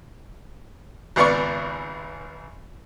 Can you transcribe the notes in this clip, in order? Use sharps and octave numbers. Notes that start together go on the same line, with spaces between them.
G#1 C#2 B3 D5 C#6